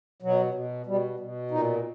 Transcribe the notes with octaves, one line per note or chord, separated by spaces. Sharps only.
B2 F#3
B2
B2 G3
B2
A#2 D#4